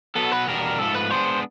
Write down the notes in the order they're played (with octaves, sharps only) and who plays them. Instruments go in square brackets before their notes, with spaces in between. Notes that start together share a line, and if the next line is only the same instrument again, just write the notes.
[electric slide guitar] B2 F#3 B3 [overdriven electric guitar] A4
[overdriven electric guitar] B4
[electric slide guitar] E2 B2 G3 A#3 D4 [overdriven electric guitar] A#4
[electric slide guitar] G#2 F3 A3 [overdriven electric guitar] A4
[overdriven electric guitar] B4
[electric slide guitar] G#3 B3 D4 [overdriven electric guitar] C5